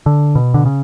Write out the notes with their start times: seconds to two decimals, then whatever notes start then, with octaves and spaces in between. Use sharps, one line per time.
0.06 D3
0.35 B2
0.54 D3
0.66 C#3